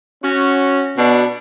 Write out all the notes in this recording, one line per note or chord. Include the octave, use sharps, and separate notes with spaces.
C#4 F#4
B2 D4